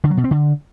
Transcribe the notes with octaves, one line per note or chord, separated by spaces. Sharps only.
D3
F#3
B2
C4
D3